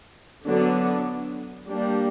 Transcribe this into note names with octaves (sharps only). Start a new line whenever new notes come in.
D3 F#3 B3 D4
G3 A#3 D4